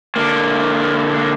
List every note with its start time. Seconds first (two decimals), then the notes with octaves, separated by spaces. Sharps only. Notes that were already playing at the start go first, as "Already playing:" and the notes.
0.16 D3 A#3